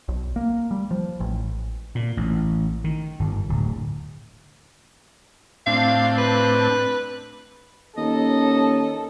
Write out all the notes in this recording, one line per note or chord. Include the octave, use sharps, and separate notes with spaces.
B1
A#3
G3
F3
A1
A#2
A1
D#3
G1
D1
A2 C4 D4 F5
B4
D#2 C#4 A4 D#5